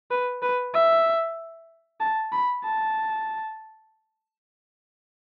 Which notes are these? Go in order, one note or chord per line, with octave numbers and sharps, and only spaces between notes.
B4
B4
E5
A5
B5
A5